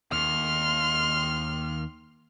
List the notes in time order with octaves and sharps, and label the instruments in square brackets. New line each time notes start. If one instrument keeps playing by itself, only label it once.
[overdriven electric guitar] D#2 [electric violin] C6 F6